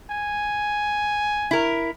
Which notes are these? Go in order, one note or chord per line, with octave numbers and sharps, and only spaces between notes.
G#5
E4 A#4